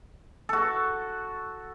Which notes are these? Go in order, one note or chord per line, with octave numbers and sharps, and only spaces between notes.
F#4 A4